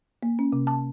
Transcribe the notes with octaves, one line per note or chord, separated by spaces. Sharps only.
A#3
C#4
C3
A5